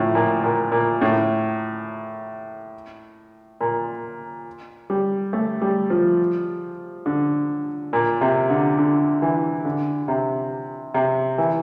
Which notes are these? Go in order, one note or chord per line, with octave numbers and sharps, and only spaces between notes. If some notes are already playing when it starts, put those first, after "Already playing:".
Already playing: A2 F3
A#2
A#2
A#2
A2
A#2
G3
A3
G3
F3
D3
A#2
C3
D3
D3
E3
D3
C3
C3
E3